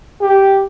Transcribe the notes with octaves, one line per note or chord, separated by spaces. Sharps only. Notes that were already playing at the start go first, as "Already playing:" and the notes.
G4